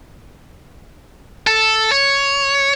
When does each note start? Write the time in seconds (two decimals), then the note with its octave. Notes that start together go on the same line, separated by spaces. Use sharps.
1.47 A4
1.92 C#5